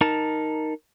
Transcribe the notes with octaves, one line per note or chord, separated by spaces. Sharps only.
D#4 A#4 A5